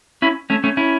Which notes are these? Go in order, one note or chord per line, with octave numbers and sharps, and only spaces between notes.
C#4 E4
A3 C#4
A3 C#4
C#4 E4